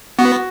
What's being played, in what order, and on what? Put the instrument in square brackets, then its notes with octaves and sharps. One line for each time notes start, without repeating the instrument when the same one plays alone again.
[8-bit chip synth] B3 [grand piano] F#4